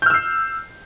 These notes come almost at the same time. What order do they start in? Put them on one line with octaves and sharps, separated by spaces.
G6 F6 E6 C7